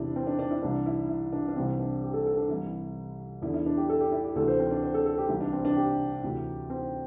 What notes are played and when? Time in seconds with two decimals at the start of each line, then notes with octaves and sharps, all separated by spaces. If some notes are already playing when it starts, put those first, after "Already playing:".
Already playing: E2 C3 E3 D4 E4
0.16 C4
0.27 D4
0.39 D4
0.51 E4
0.62 C2 C3 E3 D4
0.86 E4
1.09 E4
1.33 D4
1.48 D4
1.55 C2 C3 E3 C4
1.79 D4
2.02 G4
2.13 A4
2.26 A4
2.37 D4
2.49 C2 C3 E3 E4
3.42 E2 E4
3.45 D3
3.54 E4
3.66 D4
3.77 G4
3.89 A4
4.00 G4
4.12 E4
4.24 G4
4.36 D2 C3 E3 A4
4.48 C5
4.60 C4
4.71 D4
4.83 C5
4.94 A4
5.06 A4
5.18 G4
5.29 C2 C3 E3 E4
5.41 D4
5.53 C4
5.65 D4
5.76 G4
6.23 D2 C3 E3
6.70 C4